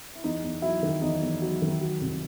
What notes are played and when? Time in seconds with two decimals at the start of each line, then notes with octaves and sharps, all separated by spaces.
0.15 E4
0.24 E2 D#4
0.43 E2
0.62 F#3 E4
0.83 D#3
1.02 E2 D#4
1.22 E2
1.42 F#3
1.62 D#3
1.81 F#3
2.01 C2